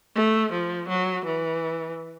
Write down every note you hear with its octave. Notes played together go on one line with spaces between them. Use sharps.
A3
F3
F#3
E3